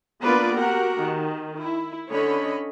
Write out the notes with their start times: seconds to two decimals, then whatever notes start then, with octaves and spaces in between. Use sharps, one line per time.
0.24 A#3 B3 D4 F4 B4 D5
0.57 F#4 G4 A#4 F#5
0.98 D#3
1.60 E4
2.10 D3 C#4 C#5 D#5 B5